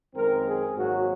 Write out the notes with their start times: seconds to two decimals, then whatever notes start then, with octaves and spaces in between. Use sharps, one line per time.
0.14 F#2 D#3 G#3 C4 A#4
0.45 G#4
0.76 G#1 G#2 F#3 A#3 F#4